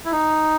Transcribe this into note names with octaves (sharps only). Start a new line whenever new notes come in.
E4
D#4